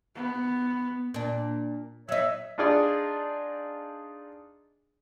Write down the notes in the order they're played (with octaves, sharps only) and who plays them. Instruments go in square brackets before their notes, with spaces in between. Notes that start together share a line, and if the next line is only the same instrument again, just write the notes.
[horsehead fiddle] B3
[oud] A#2 D4
[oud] F#3 D#4 [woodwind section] C#5 E5
[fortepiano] D4 D#4 F4 G#4 D5 D#5